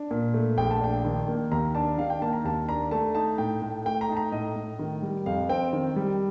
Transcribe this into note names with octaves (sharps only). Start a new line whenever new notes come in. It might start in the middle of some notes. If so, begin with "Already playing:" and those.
Already playing: D4
A#2
A3
A#1 G5
A5
D4 G5
D#3
A#3
D#2 A#5
D4 A5
D#3 F5
G5
A#3 A5
A#5
D#2 A5
D4 A#5
A3 A5
D#4 A5
A2 G5
A2
A3 G5
A#5
D#4 A5
A#5
A2 D#5
A2
D#3
G3
F2 F5
C4 G5
D#3
G3